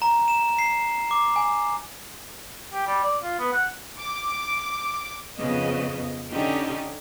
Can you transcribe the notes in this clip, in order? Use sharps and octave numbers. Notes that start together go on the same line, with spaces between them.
A#5
E7
C7
D6
G#5
G4
G3
D5
F4
B3
F#5
D6
F2 C#3 B3 D#5
D3 C#4 D#4 G4